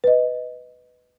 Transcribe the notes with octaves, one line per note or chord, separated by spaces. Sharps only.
B4 D#5